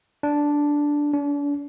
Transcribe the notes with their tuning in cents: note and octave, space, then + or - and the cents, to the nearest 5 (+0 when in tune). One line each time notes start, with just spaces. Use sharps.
D4 -5
D4 -40